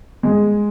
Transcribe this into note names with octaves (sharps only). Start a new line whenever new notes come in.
G#3